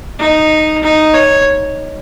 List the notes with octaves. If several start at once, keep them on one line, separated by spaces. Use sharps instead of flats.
D#4
D#4
C#5